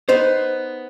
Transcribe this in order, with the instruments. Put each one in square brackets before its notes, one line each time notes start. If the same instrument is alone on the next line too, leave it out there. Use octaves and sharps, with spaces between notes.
[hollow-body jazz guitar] B3 D#4 C5